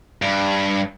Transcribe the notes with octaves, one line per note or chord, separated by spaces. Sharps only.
G2